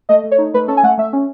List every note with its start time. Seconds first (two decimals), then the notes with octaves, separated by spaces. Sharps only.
0.09 A3 D#5
0.24 A3
0.32 C#5
0.38 D#4
0.54 A3 B4
0.68 C#4 A4
0.77 G#5
0.83 A3 F#5
0.98 A3 E5
1.13 C#4